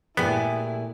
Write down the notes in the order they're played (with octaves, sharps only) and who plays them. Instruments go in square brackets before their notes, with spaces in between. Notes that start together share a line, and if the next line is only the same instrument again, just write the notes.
[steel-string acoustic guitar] A#2 G#5 [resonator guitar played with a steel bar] A3 G4 G#4 [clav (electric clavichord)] B3 [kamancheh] E4